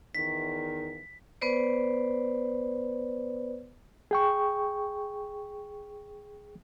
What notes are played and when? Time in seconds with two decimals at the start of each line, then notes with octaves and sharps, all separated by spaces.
0.15 E2 D#3 B6
1.41 B3 B4 C5 D5
4.11 G#4 G5 C#6